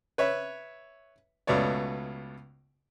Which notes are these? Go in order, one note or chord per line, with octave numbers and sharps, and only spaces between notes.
B4 C#5 E5
C#2 B2 A3 B3 C#5 D5